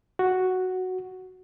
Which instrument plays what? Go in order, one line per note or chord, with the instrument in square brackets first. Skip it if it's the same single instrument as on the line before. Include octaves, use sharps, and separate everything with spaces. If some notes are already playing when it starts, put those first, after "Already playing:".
[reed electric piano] F#4